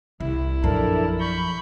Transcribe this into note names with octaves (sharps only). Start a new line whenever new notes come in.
C2 E4
A#1 F#2 F3 D4 A4 A#4
B5 C#6 G6